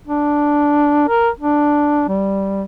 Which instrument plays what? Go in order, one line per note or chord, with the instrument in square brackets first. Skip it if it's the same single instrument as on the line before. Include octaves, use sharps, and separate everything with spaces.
[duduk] D4
A#4
D4
G3